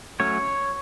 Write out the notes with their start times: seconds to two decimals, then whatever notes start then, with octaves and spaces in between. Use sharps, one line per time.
0.20 F#3 A3 C#4 C#5